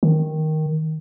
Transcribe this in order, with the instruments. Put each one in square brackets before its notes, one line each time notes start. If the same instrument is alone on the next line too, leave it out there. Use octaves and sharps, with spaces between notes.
[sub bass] D#3